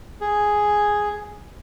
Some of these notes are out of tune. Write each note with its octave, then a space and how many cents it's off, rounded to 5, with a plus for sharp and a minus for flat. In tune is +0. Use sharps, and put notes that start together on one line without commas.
G#4 +0